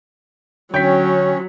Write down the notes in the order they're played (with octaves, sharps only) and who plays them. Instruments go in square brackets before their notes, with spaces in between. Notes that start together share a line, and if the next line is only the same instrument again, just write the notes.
[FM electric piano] D3 G5 [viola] F#3 [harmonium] C#4 [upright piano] C#5 B6